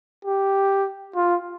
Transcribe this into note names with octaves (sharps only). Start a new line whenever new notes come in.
G4
F4